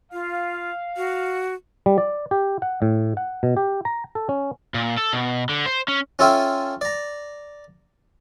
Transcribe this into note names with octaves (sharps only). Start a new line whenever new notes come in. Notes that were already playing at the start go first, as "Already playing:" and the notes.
F4 F5
F#4
G3
D5
G4
F#5
A2
F#5
B2
G4
A#5
A4
C#4
A#2
A4
B2
D3
C5
C#4
C#4 F4 A4 E5 G5 G#5
D5 A#5